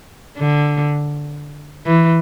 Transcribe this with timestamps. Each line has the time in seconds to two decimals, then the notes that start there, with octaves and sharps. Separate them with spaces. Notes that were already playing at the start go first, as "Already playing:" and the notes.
0.37 D3
1.86 E3